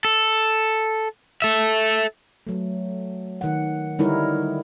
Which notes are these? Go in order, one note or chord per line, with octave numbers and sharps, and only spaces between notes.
A4
A4 E5
F#3 A3
D#3 F#5
D3 G3 D#4 E4 A#4 C#5